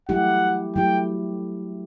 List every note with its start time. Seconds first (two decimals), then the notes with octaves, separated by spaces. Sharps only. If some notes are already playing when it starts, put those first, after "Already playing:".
0.09 F#3 A3 E4 G4 F#5
0.76 F#3 A3 E4 G4 G5